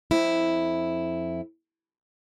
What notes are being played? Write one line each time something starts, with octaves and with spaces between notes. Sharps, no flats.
F2 E4